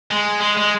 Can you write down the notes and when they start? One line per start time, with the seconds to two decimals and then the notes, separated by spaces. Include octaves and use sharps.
0.11 G#3
0.41 G#3
0.57 G#3